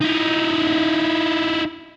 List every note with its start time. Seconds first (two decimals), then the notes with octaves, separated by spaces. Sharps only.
0.01 D#4 E4